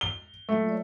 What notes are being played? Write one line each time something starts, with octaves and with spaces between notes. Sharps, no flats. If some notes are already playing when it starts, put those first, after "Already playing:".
G7
F#3 A3 A#3 F4
C#5 D5